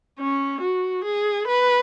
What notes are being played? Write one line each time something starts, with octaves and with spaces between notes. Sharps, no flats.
C#4
F#4
G#4
B4